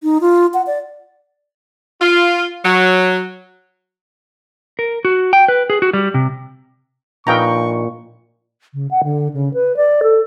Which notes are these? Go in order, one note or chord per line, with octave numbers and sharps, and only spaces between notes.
D#4
F4
F#5
D5
F4
F#3
A#4
F#4
G5
B4
G#4
F#4
G3
C3
A#1 A#2 D#4 B4 F5 G5 A#5 C#6
C#3
F#5
D3
C#3
B4
D5
A4